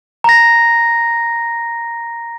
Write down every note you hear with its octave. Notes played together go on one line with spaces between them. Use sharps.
A#5 A#6